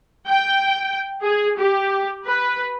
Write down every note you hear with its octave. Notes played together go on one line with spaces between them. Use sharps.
G5
G#4
G4
B4